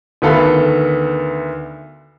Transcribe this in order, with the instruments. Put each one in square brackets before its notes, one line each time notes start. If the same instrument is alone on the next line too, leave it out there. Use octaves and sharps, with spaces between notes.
[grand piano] D2 D#3 B3 A4 F5 B5